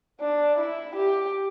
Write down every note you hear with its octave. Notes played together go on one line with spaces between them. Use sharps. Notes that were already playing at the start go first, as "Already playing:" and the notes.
D4
E4
G4